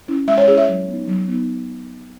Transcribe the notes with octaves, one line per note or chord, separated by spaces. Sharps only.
C#4 E4
G#3 E5
C#5
C#4 E4 G#4
E5
F#3
B3 D#4
F#3
B3 D#4